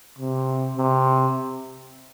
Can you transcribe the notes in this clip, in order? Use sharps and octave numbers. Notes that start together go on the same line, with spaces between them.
C3
C3